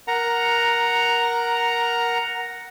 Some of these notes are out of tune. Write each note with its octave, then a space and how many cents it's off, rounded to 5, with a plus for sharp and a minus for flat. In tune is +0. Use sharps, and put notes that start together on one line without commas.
A#4 +10 F#5 +0 A#5 +0